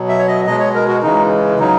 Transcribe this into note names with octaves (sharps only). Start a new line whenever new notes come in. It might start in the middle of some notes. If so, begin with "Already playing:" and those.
Already playing: B2 F#3
E5
C#5
D#5
B2 G#3 D#5
C#5
A#4
F#4
C#3 E3 G#3 D#4
C#3 F#3 D#4